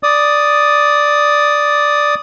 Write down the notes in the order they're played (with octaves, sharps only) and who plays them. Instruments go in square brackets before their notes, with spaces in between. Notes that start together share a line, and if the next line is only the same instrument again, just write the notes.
[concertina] D5 D#6